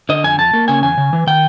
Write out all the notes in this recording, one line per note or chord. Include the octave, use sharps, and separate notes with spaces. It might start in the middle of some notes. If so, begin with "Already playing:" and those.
D3 D#5
F2 G#5
F2 A5
A#3
C#3 G#5
E2 G#5
C#3
E3
D#3 G5